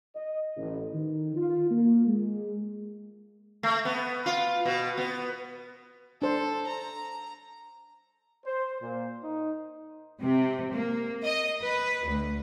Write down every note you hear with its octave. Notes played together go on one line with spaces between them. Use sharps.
D#5
A1
D#3
F4
A#3
G#3
A3
B3
F4
B2
B3
D4 A4 C5
A#5
C5
A#2
D#4
C3
A#3
D#5
B4
D2